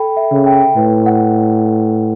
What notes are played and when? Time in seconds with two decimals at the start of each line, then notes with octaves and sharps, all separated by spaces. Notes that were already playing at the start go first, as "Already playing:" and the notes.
Already playing: A4 G5 B5
0.17 E5
0.31 C#3
0.46 G5
0.76 A2 B4
1.06 F#5